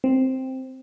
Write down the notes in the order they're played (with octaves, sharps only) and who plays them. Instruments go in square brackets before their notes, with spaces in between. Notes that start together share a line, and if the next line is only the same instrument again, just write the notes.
[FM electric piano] C4